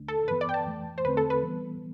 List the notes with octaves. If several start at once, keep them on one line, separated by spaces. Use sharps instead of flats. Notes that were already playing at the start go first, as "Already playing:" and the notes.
Already playing: D2 D3 A3 D4
A4
G2 E3 B3 B4
D5
G5
A5
F2 E3 A3
C5
E2 D3 A3 C4 B4
A4
B4
E3 G3 B3